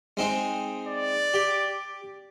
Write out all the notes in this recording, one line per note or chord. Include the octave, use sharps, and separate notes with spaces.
G#3 C4 D#4
D5
G4